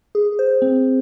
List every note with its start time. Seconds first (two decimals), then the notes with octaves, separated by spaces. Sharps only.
0.15 G#4
0.39 C5
0.62 C4